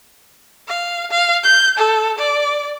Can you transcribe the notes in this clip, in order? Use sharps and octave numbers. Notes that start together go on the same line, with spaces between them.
F5
F5
G6
A4
D5